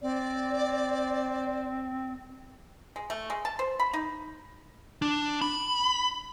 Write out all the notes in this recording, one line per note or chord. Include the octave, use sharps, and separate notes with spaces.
C4 D5
G#3
A3
G#3
A5
C5
B5
D#4
D4
B5